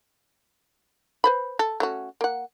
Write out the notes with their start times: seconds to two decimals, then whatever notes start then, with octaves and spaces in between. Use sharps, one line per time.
1.24 B4 C5 B5
1.59 A4
1.80 A3 C#4 F#4
2.21 A#3 F#5